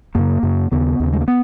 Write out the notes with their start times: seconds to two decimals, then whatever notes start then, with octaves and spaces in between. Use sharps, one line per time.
0.15 F#2 C#3 A#3
0.43 F#2 C#3
0.72 D#2 C#3 B3
1.00 D#2 C#3
1.13 G#3
1.21 A#3
1.28 B3